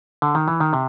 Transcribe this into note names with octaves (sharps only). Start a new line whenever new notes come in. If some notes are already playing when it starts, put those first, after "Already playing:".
D3
D#3
E3
D#3
C3